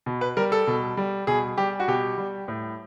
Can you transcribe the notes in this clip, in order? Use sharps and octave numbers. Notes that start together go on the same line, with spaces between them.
B2
B4
G3 A#4
A4
B2
G3
B2 G#4
G3 G4
F#4
B2 G4
G3
A2